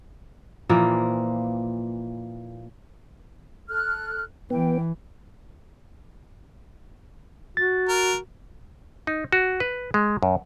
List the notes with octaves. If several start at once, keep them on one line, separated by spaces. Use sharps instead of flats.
A#2 E3 F3 A#3
A4 F6 F#6
E3 B3 G5
F#4 A6
A#4
D#4
F#4
B4
G#3
F#2